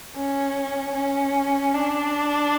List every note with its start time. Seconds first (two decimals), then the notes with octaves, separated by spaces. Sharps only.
0.15 C#4
0.95 C#4
1.73 D4